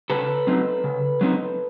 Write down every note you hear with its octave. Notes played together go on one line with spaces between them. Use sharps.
C#3 A4 B4
F#3 A3 C4 D#4
C#3
F#3 A3 C4 D#4